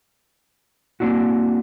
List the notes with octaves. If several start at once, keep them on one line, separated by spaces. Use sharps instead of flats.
A#3 C4 D4 E4 F#4